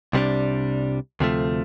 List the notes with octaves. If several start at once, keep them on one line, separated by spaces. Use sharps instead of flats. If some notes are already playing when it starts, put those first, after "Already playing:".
C2 C3 G3 D4
D2 C3 F3 A3